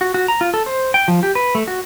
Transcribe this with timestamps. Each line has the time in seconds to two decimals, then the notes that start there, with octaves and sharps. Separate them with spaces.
0.01 F#4
0.14 F#4
0.28 A#5
0.41 F4
0.54 A4
0.66 C5
0.94 G5
1.08 F3
1.23 G4
1.35 B4
1.55 A3
1.68 F#4